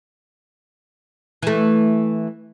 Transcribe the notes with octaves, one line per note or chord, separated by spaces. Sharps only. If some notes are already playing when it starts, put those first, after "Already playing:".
E3 A3